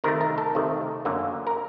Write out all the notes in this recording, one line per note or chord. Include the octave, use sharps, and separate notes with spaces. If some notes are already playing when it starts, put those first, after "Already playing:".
C3 D#3 A3 A#4
A#4
A4
C3 D#3 A3
F#2 D3 F#3 A#3
A#4